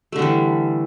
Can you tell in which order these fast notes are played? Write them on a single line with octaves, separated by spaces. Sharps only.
A3 D3 G3 E3